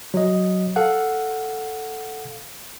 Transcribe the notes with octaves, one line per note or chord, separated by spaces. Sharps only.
F#3 D#5
A4 F5 F#5